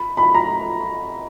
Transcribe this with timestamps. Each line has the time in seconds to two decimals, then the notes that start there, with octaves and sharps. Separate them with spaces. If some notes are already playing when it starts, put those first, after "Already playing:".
Already playing: B5
0.17 B5
0.35 A#5